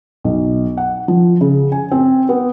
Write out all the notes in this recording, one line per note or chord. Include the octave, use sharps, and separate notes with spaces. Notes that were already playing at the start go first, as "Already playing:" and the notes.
B1
F#5
F3
C#3
G#5
C4
B3